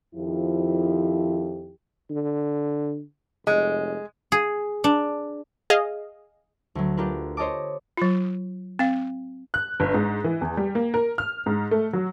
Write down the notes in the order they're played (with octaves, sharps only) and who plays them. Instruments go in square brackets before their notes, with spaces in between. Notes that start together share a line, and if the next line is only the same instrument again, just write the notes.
[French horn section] F2 D#3 F3 E4 G4
[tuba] D3
[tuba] F1 [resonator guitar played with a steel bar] G#3
[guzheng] G#4
D4
[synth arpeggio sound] G#4 D#5 F5
[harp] D2 F#3
D4 F4 G4 A#4 B4
C5 C#5 D#5 A5 D6
[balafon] F#3 F4
C4 F5
[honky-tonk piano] F#6
G1
G#2
E3
E2
G3
A#3
A#4
F6
G#2
A3
F#3